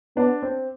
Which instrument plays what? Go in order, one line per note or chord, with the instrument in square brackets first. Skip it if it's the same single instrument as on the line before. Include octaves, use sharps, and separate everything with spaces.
[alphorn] B3 [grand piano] D4
[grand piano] C4